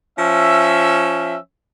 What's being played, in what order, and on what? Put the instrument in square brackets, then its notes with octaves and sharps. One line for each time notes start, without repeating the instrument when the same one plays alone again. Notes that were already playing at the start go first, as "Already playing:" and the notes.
[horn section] F3 C#4 E5